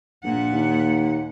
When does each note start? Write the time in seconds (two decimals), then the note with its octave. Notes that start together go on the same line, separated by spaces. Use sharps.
0.23 A#1 A#2 F#5
0.52 D#2